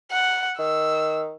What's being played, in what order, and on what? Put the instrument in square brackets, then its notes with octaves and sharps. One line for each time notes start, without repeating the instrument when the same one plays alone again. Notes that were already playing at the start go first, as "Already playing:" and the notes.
[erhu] F#5
[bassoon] D#3 [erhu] E6